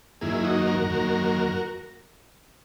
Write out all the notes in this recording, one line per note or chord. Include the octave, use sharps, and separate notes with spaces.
F#2 D#3 A#3 E4 G#4
D#4 F#4
F#4 A#4
F#2 D#3 A#3